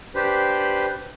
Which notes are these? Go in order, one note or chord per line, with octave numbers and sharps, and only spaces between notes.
D4 G4 B4 C5 B5